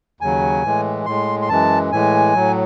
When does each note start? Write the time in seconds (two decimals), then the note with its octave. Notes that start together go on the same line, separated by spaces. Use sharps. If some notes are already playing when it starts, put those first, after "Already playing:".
0.21 D#2 C#3 F#3 G#5
0.64 A2 E3 G#3
1.06 A2 G#3 C6
1.42 C6
1.49 F#2 E3 G#3 A5
1.91 A2 E3 G#3 G#5
2.34 A2 F#3